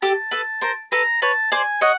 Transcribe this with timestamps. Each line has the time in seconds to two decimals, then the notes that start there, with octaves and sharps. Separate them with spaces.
0.02 G4 A4 A5
0.31 A4 B4
0.61 A#4 C5
0.92 A4 B4 A#5
1.22 B4 C#5 A5
1.52 C5 D5 G#5
1.81 C#5 D#5 F#5